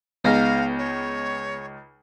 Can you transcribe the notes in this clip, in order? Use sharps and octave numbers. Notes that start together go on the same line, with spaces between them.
C#2 G#3 B3 D#4 F5 A#6
C#5